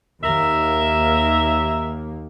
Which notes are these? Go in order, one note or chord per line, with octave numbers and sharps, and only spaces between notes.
D#2 A#3 A#4 E5